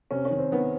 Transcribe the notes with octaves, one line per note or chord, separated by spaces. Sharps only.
C3 C#4
C#4
D#3
C4
D#3 B3